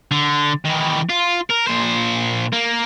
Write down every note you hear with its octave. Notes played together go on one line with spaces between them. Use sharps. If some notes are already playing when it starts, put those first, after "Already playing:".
D3
D#3 E3
F4
A#4
A#2 C5
A#3